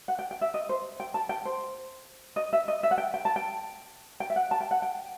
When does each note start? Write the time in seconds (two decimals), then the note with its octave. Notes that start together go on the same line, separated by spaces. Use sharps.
0.08 F#5
0.19 G5
0.31 G5
0.41 E5
0.54 D#5
0.69 C5
1.00 G5
1.14 A5
1.29 G5
1.45 C5
2.36 D#5
2.53 E5
2.68 D#5
2.83 E5
2.91 F#5
2.98 G5
3.14 G5
3.25 A5
3.36 G5
4.20 G5
4.30 E5
4.36 F#5
4.51 A5
4.61 G5
4.71 F#5
4.82 G5